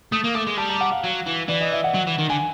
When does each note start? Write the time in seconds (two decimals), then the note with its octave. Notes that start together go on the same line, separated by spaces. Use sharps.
0.12 A3 D#6
0.24 A#3
0.35 A3 D6
0.47 G#3
0.57 G3 A5
0.69 A#5
0.81 F#5
0.92 F5
1.04 F#3
1.27 E3
1.49 E3 D5
1.61 D#5
1.73 E5
1.84 F#5
1.94 F#3
2.07 E3
2.18 D#3
2.29 D3 G#5